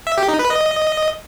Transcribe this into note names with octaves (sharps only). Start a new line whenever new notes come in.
E5
G4
D#4
B4
D#5